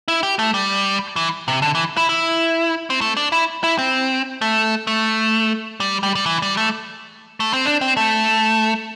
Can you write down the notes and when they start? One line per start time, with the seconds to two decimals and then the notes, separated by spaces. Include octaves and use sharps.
0.08 E4
0.23 G4
0.39 A3
0.54 G3
1.16 E3
1.48 C3
1.62 D3
1.75 E3
1.97 E4
2.09 E4
2.90 C4
3.01 A3
3.17 D4
3.32 E4
3.64 E4
3.78 C4
4.41 A3
4.87 A3
5.80 G3
6.03 G3
6.15 G3
6.26 E3
6.42 G3
6.57 A3
7.40 A3
7.53 C4
7.65 D4
7.81 C4
7.97 A3